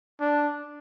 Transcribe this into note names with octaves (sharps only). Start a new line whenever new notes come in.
D4